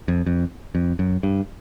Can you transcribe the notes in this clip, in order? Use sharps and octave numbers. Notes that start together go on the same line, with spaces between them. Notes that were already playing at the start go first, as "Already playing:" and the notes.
F2
F2
F2
F#2
G2